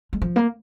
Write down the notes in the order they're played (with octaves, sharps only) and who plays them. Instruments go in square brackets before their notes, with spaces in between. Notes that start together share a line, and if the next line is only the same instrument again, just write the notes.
[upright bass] G#3
F3
A#3